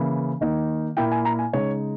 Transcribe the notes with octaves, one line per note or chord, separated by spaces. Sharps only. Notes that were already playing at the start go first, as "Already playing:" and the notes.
Already playing: C#3 E3 A#3 E4
D#3 A#3 D#4
A#2 A#3 E4 G5
G#5
A#5
G#5
C#3 G#3 D#4 C#5